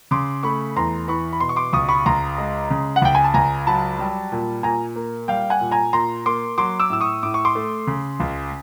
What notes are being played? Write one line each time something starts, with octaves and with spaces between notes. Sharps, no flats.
C#3 C6 D6
A3 B5 C#6
E2 A#5 C6
E3 B5 C#6
B5
B2 C6
C#6
C6 D6
C#2 C#6 D#6
B5 C#6
C#2 A#5 C6
G#3
C#3
F#5
C#2 G5
G#5
A5
C#2 G#5 A#5
F#3 A5 B5
G3
A#2
A#2 G#5 A#5
A#3
G3 F5 G5
F#5 G#5
A#2
G#5 A#5
A#2 A#5 C6
A#3 C6 D6
F#3 C6 D6
D6 E6
A2 E6
C#6 D#6
A2 D6
C#6
C6 D6
A3
C#3
C#2